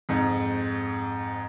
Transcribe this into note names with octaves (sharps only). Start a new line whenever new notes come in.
F2 G#2